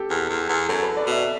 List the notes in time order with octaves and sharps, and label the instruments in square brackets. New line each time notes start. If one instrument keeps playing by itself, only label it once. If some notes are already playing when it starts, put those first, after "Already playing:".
Already playing: [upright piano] G4 A4
[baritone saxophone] E2
E2
E2
[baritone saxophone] F#2 [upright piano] A4
[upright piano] B4
D5
[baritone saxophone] B2 [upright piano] E5